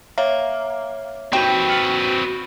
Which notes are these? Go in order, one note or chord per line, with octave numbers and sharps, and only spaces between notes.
A#3 C#5 E5
D#3 C4 F#4 G4 B4 G5
F6 C#7 F#7